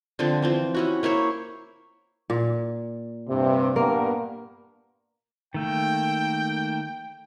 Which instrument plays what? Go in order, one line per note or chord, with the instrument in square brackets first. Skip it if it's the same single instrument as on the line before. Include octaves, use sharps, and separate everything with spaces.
[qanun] D3 F3 C4
E3 F3 C4
C#4 E4 F#4
A#3 E4 C5 C#5
[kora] A#2
[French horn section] G2 C3
[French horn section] G2 B3 A#4 [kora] A#3
[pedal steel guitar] D#3 A3 A#3 [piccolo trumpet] G5